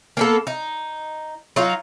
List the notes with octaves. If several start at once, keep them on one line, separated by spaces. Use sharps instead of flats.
A#3 B3 A4
D#4
F#3 D#4 F4